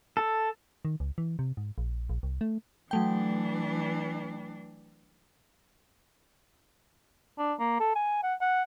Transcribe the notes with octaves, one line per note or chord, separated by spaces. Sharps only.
A4
D#3
C#2
E3
C3
G#2
A#1
A#1
C2
A3
E3 F#3 A3 D4 G5
D4
A#3
A4
G#5
F#5
F#5